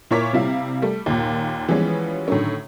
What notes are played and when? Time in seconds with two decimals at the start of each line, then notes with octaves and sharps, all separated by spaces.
0.11 A#2 E4 A#4 C#5 D6 B6
0.33 C3 G3 E4 F5
0.82 G3 A3
1.06 D#2 A#2
1.69 E3 F3 G3 G#3 B3 C#4
2.28 A2 D3 D#3 F#3 C#4